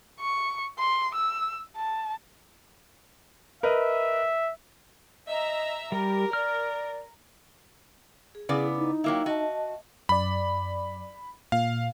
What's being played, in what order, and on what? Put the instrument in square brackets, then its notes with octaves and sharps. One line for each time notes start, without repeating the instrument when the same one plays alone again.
[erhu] C#6
C6
E6
A5
[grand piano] A#4 B4 D#5 [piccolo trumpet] E5
[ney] D#5 [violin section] E5 A#5
[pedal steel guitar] G3 [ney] G4 [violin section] A#4
[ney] D5 [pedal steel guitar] F6
[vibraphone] G#4
[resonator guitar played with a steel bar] C#3 B3 D5 [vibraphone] E4 [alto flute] G#4
[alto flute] D#4
[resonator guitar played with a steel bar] F#3 A#3 E4 [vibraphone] F5 G5
[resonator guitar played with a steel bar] F#4 [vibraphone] D#5 A5
[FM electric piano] F#2 D5 [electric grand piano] B5
[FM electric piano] A#2 [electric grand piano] F5